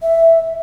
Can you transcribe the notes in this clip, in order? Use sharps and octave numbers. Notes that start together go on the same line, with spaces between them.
E5